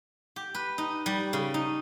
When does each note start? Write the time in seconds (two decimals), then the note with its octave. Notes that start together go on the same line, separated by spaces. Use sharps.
0.36 G4
0.54 B4
0.78 D#4
1.06 G3
1.33 C#3
1.54 D#4